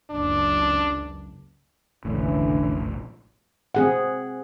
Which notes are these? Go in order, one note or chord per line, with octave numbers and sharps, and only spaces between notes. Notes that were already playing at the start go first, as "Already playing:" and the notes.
F#1 C#2 D4
F1 A#1 A2 D3 E3 C#4
C4 G#4 F#5